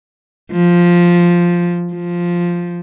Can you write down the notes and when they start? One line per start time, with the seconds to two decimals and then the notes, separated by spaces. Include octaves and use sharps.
0.52 F3
1.93 F3